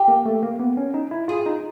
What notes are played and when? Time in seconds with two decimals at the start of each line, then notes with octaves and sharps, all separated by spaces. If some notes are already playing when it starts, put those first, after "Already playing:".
Already playing: G4
0.08 A#3
0.25 A3
0.43 A#3
0.60 B3
0.77 C#4
0.94 D#4
1.11 E4
1.28 F4 G#4
1.46 D#4